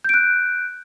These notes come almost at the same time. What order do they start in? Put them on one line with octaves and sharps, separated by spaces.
G6 D7 F#6